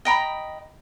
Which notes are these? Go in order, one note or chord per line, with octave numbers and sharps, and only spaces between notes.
D#5 G5 A#5 B5